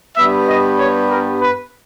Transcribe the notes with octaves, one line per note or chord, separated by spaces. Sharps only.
G2 G3 B3 E5
D#5
C#5
A#4
B4